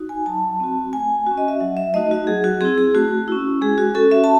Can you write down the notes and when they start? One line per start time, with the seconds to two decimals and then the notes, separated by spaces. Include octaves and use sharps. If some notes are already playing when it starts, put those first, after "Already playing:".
Already playing: D#4 F#4
0.09 G#5
0.26 F#3 A5
0.60 C4 F#4
0.93 A3 G#5
1.27 C#4 F#4
1.38 D#5
1.48 E5
1.60 F#3 F#5
1.77 E5
1.94 A3 D#4 F#4 D#5
2.11 F#4
2.27 F#3 G#4
2.44 F#4
2.61 C4 E4 G#4
2.78 G#4
2.95 A3 F#4
3.28 C#4 E4
3.61 G#3 G#4
3.78 F#4
3.95 C#4 F#4 A4
4.11 E5
4.24 A5